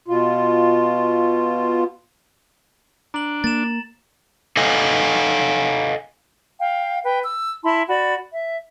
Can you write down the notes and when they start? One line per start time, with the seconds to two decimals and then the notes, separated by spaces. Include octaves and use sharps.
0.08 B2 F4
3.14 D4 A#5 F#7
3.44 A#3 A6 E7
4.57 A4 D#5 F5 F#5 G#5
6.60 F5 G5
7.04 B4 G5
7.25 E6
7.63 E4 A5 B5 C6
7.88 F#4 D5 B5
8.31 E5